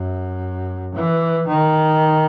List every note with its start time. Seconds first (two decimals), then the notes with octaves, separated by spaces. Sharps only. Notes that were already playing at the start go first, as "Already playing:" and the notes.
Already playing: F#2
0.96 E3
1.48 D#3